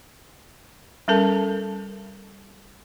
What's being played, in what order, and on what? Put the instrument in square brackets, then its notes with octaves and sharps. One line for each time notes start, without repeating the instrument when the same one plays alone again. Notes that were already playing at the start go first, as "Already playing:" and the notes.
[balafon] G3 C#4 A4 A#4 A5